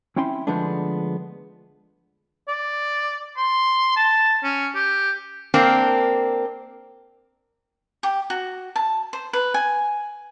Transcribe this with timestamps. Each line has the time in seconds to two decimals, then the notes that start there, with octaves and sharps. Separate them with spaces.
0.16 C4 C#4 E4 G5 C6
0.47 D3 F3 G#3 A3 B3 D4
2.48 D5
3.37 C6
3.96 A5
4.44 C#4
4.75 G4
5.54 A#3 C4 D4 A#4
8.03 G4
8.30 F#4
8.76 A5
9.13 C5
9.33 B4
9.54 G#5